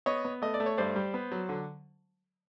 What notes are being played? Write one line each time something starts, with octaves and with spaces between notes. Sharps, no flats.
B3 C#5 D#5
B3
A3 D#5
D5
A3
C#5
G2 C5 D5
G3
B3
F#3
D3